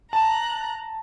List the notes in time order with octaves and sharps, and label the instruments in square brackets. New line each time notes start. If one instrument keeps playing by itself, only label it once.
[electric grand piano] A5 [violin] A#5 F#6